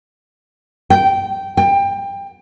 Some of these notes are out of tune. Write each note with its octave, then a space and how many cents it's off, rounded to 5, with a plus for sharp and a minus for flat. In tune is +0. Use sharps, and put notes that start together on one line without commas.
G5 -10
G5 +20